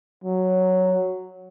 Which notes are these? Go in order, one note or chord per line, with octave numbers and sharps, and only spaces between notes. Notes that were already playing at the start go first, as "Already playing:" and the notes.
F#3